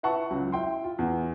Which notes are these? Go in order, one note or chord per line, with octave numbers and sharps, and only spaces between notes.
E4 B4 F#5 A5 C#6
C#2 F#3
E4 G5 C6
F4
E2